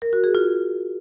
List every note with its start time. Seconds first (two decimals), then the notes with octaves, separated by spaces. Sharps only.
0.02 A#4
0.13 F#4
0.24 G#4
0.35 F4